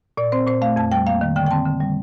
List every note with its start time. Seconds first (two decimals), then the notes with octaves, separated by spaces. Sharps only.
0.17 A#2 D5
0.32 C4 C5
0.47 A#2 C5
0.62 A3 F5
0.76 F2 A5
0.92 G3 G5
1.06 A#3 F5
1.21 D#3
1.36 D3 G5
1.46 G5
1.51 C4 A5
1.65 D3
1.81 G3